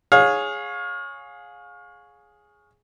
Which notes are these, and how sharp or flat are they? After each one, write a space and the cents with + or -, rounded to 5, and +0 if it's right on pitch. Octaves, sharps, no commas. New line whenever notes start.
G#4 +0 C#5 +0 F5 +30